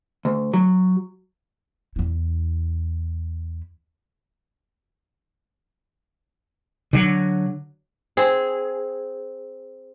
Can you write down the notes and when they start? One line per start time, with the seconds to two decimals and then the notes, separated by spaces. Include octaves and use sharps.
0.25 D2
0.54 F#3
1.96 E2 E4
6.93 D3 F#3
8.17 C4 G#4